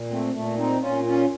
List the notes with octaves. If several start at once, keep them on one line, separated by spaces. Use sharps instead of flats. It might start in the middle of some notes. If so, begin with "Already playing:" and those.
Already playing: A#2
A3 C4
A#2 A3
C4 D#4
A#2 C#4 F4
C#4 F4